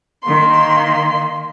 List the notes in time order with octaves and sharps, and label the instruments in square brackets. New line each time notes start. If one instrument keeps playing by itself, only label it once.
[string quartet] D#3 A#3 C6